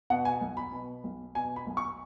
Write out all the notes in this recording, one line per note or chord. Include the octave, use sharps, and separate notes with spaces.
B2 F#5
G#5
B1
B5
B2
B1
B2 G#5
B5
B1
C#6